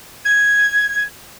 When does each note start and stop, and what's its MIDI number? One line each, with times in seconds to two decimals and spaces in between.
0.24 1.03 92